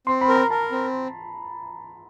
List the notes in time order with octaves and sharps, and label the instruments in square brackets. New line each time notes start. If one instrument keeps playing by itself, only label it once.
[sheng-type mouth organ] C4 [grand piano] C6
[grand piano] B5
[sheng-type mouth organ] A#4
[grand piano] A#5
[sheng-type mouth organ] A#4 [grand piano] A5
[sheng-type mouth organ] C4